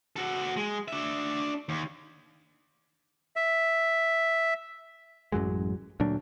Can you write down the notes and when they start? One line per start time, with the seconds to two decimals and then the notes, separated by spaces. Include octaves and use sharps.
0.16 F#4 A4
0.56 G#3
0.88 D4 E5
1.69 D#2
3.36 E5
5.32 A1 F#2 F#3 G#3
6.00 D2 A#2 F#3 D4